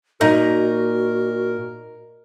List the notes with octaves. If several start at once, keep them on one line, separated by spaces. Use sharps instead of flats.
A#2 D#4 F#4 A#4